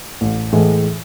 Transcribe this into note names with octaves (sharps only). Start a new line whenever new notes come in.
A1
A2 E3 G#3